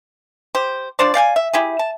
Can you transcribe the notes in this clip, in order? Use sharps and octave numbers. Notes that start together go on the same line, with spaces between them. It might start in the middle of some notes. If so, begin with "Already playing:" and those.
G4 C5
F3 D4 C5 D5
D5 F5 G5 G#5
E5
E4 G4 G#4
A5